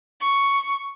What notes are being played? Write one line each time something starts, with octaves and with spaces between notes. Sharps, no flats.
C#6